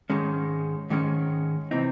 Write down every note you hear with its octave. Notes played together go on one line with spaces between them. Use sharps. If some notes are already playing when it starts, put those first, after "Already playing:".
G#2 D#3 G#3 C#4
G#2 D#3 G#3 C#4
C3 E3 C4 D#4